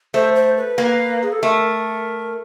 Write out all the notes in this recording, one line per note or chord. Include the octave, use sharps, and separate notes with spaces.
A3 C5
C5
B4
A#3
G#4
A4
A3 A#4